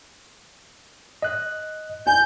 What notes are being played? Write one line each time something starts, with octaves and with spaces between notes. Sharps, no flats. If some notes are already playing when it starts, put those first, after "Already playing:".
D#5 F#6
G#5 G6